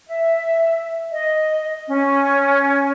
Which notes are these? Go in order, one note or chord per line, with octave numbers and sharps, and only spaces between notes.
E5
D#5
C#4